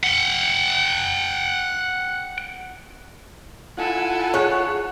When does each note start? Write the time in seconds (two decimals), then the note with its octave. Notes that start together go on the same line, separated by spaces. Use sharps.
0.04 F#5 G5
3.77 E4 F4 A4 F#5 G#5
4.34 G#4 C#5 F#6